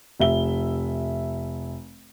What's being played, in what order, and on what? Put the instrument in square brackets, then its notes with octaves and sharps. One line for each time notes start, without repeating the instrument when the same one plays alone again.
[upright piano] F1 E5 G7